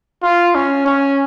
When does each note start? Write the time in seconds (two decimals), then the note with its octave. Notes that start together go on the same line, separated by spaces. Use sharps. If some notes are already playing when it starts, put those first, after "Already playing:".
0.23 F4
0.55 C#4
0.86 C#4